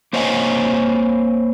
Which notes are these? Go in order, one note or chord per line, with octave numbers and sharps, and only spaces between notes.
A#3 C5 C#5 D#5 F5 G#5